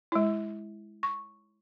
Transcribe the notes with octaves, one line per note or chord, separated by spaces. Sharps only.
G#3 E4
C#6